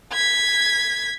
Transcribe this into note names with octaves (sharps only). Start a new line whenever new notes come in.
G#6 B6